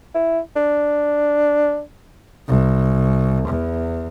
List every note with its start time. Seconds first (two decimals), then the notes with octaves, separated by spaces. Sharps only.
0.14 E4
0.56 D4
2.48 C2
3.48 E2